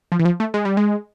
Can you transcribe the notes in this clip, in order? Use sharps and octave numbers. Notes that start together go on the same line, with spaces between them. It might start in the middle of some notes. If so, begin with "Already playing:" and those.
F3
E3
F3
A3
G#3
G3
G#3